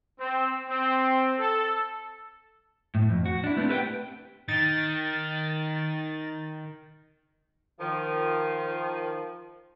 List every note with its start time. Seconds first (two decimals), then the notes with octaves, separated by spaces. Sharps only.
0.19 C4
0.69 C4
1.39 A4
2.95 A2
3.10 F2
3.26 F#4
3.44 D4 E4
3.57 A3 B3 C4 D4 E4
3.68 G4 A4 B4 C#5 F#5 G5
4.48 D#3 A6
7.80 D#3 F3